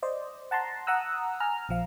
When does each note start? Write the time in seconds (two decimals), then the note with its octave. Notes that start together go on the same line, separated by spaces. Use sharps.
0.03 C5 D5 D#5
0.51 F#5 A5 A#5 C6
0.87 F#5 A#5 D#6 E6 F#6
1.40 G#5 A#5 F6
1.69 A#1 F3 F5